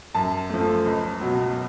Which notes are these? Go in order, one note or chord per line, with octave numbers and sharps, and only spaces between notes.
F#2 A5
F3 A3
C#2
B2 F#3